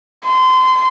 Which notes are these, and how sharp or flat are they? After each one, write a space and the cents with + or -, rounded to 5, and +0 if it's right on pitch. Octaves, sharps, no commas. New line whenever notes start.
C6 -25